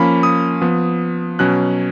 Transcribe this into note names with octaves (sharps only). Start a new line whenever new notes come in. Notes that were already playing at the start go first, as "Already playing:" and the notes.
Already playing: F3 A#3 C#4 B5
D#6
F3 B3
B2 F#3 C#4 F#6